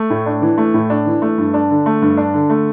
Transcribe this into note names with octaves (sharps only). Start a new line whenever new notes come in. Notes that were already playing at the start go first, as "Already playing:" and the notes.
Already playing: A3
A2
D4
E3
A3
A2
D4
E3
A3
G2
D4
D3
A3
G2
D4
D3
A3